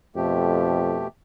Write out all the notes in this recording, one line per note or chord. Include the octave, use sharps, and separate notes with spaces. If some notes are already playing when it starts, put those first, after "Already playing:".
F2 B2 A3 G4